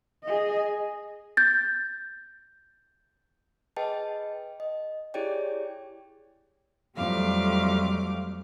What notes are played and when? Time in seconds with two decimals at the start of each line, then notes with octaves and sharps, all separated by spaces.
0.23 G#4 D#5
1.37 G6 A6
3.76 G#4 B4 D#5 G5 A5
4.60 D#5
5.14 E4 G4 G#4 C#5 D5 G5
6.96 F2 F#3 G3 A3 F5 D6